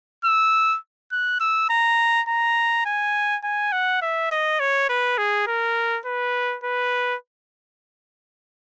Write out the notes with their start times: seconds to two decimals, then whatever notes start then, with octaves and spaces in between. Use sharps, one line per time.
0.25 E6
1.12 F#6
1.40 E6
1.70 A#5
2.28 A#5
2.86 G#5
3.44 G#5
3.72 F#5
4.02 E5
4.32 D#5
4.60 C#5
4.90 B4
5.18 G#4
5.47 A#4
6.05 B4
6.64 B4